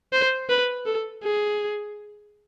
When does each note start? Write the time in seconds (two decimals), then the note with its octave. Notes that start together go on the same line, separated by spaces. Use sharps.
0.13 C5
0.49 B4
0.86 A4
1.24 G#4